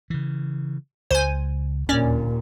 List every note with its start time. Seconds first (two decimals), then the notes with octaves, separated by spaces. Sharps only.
0.10 C#3 E3
1.11 C#2 C5 G#5
1.89 D1 D#2 A#2 C#4 D4 D5